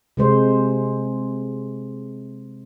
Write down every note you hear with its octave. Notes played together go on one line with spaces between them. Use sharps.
C3 G#3 C5